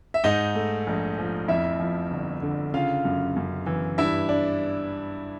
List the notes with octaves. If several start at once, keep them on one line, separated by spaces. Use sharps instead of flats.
E5
G#2 D#4 D#5
A3
A#1
F3
F2 E4 E5
F3
G1
D3
C#3 F4 F5
F#2
F#2
E3
G2 E4 E5
D4